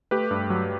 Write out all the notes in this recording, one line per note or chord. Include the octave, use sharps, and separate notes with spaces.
A3 G4 B4
G2
F#3